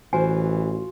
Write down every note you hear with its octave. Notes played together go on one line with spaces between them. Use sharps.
A1 E3 F4 F#4 C5 G#5